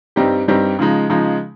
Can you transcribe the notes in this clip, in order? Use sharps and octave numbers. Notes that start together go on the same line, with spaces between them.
G2 G3 C4 D#4 G4
G2 G3 C4 D#4 G4
C#3 F3 G#3 D#4
C#3 F3 G#3 D#4